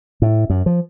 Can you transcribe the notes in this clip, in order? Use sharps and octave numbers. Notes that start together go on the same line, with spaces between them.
A2
F#2
F3